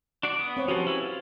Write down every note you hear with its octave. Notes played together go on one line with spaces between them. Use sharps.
D4 F#4 D5
B3 D#6
C4 C#5 F#5
F3 F#3 C#4 F#4 G4 B4
C#4 E4
F4